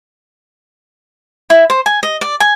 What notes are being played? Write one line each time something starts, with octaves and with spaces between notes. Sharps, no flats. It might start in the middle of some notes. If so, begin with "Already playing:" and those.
E4
C5
G#5
D#5
D5
G#5